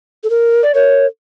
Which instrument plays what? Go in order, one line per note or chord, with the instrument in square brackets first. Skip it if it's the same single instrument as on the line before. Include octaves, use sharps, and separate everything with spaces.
[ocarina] A4
A#4
[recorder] D5
[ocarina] A#4 [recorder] C#5